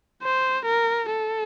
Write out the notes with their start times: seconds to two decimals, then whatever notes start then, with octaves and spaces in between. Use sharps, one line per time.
0.22 C5
0.66 A#4
1.10 A4